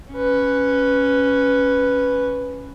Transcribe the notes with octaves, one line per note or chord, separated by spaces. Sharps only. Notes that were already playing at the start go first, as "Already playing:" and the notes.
C#4 B4